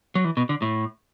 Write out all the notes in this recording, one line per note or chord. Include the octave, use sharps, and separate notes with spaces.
F#3
E3
B2
D3
A2